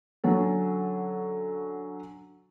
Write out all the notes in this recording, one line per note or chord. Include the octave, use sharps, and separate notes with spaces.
D3 F#3 C#4 A4